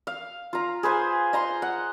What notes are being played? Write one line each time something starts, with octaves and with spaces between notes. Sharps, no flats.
F5
F4 A#5
G#4 B4 C5 G#5
D#5 A#5 C6
F#5